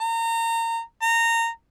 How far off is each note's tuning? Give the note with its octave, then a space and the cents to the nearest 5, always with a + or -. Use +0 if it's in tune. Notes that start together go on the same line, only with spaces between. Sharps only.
A#5 -30
A#5 -20